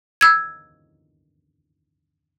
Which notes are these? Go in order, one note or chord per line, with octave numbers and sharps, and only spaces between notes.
E6 G#6